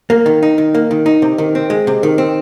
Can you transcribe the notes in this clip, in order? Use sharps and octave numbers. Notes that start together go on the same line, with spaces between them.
A#3
D#3
D#4
D#3
A#3
D#3
D#4
C3
D#3
C4
G#3
C3
D#3
C4